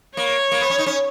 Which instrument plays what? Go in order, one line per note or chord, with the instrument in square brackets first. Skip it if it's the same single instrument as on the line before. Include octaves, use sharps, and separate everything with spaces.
[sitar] A#3 [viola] C#5
[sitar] A#3
B3
C#4
D#4
C#4